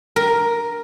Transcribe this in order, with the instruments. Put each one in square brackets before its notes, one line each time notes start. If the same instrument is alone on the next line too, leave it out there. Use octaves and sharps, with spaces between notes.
[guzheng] A#4